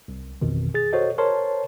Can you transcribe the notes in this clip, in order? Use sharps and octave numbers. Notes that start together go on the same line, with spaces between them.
C2
A1 F2 B2 D#3
G#4 A6
F#4 A4 C5 C#5 D#5
A#4 C5 C#5 A5 C6